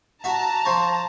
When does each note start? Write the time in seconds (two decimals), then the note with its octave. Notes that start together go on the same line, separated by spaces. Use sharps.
0.24 F#4 E5 A5 A#5
0.65 F3 C5 C#5